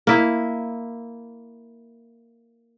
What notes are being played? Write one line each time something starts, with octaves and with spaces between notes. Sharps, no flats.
A#3 E4